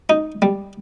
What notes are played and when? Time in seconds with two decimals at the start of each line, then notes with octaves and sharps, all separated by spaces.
0.10 D#4
0.42 G3